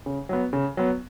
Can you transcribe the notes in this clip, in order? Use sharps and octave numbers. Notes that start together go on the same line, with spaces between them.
C#3
F#3 B3
C#3
F#3 B3